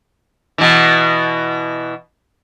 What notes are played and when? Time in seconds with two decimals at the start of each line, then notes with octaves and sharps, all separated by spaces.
0.58 B2 E3